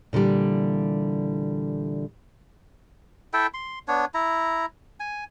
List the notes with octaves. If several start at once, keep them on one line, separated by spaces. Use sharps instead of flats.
A#2 D3 E3 G3
E4 A4 E5 G5
C6
B3 D4 C#5
E4 A#5
G#5